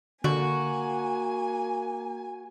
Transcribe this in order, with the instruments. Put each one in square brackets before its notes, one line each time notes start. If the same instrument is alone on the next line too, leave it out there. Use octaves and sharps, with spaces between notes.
[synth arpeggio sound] D3 [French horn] A#3 [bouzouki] F#4 [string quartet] G#5